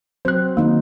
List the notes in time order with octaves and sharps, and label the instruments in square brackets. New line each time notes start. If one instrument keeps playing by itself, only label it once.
[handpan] F#3 C4 [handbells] C5 F#6
[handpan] D#3 D#4 [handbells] A#3